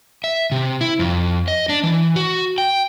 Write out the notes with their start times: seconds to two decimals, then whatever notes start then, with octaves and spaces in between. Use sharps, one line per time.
0.24 E5
0.52 C3
0.81 E4
0.99 F2
1.48 D#5
1.69 D4
1.83 E3
2.16 F#4
2.58 G5